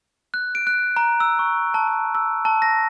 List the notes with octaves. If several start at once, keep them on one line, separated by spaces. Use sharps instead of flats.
F#6
D7
F#6
A#5
E6
C#6
A5
A5
E6
A5
A#6